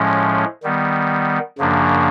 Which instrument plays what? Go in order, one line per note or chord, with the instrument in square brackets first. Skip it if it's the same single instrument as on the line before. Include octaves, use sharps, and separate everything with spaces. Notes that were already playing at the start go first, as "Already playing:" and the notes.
Already playing: [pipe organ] A2 F3 G#3 C#4
D#3 G3 B3
F#2 C#3 F3 A#3 D4